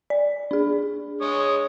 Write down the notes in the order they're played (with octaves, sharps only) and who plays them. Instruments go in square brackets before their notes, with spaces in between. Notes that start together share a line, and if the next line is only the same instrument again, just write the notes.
[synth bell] D5
D4 G#4
[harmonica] G#3 C#5 D#6